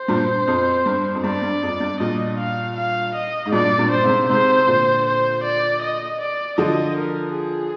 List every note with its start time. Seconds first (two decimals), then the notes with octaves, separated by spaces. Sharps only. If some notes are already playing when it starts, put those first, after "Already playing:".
Already playing: C5
0.08 G2 A#2
0.47 F2
0.86 G2
1.15 F2
1.24 G2 D5
1.42 G2
1.62 F2
1.80 G2
2.00 G2 A#2 D#5
2.38 F5
2.77 F5
3.15 D#5
3.46 G#2
3.52 G2 A#2 D5
3.78 G2 A#2
3.91 C5
4.03 G#2 C3
4.29 G#2 C3 C5
4.67 A#2 D3
5.06 C5
5.44 D5
5.82 D#5
6.21 D5
6.58 D3 F3 D#5
6.97 A#4
7.34 G#4